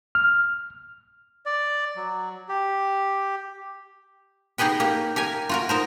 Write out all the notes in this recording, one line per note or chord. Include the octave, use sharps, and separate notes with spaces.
F6
D5
F#3
G4
D#4 G4 G#4 B4 G5
A#3 G4
G4 A#4 G#5
F4 F#4 A#4
D#4 A#4 C5